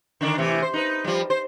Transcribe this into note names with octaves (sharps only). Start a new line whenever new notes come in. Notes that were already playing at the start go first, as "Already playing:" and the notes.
D3 D#3 D4
A2 C3 E3
C5
D#4 B4
F3 G3
C5